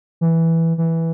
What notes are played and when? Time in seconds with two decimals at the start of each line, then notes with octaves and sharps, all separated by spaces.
0.21 E3
0.78 E3